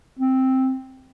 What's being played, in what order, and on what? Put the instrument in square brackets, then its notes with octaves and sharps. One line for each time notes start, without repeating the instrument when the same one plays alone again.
[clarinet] C4